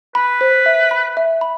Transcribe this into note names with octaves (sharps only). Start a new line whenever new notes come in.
B4 B5
C5
E5
B5
E5
B5